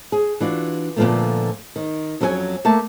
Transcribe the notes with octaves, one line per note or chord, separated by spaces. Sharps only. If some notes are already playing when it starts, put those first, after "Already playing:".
G#4
E3 D4 F4 F#4
A#2 D3 F3 F#3 A3 B3
D#3
F2 F#3 C#4 A4 C#5 G#5
A3 A#3 E5 A5